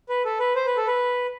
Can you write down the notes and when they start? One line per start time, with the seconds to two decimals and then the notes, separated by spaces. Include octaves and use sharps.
0.09 B4
0.25 A4
0.39 B4
0.55 C5
0.66 B4
0.77 A4
0.87 B4